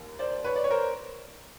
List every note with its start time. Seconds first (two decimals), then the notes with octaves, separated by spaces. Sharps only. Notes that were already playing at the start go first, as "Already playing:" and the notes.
Already playing: D#2
0.19 C5 D5
0.44 B4 C#5
0.56 D5
0.64 C#5
0.71 A#4 C5